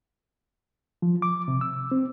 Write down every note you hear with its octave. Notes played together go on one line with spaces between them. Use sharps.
F3
D6
C3
E6
C4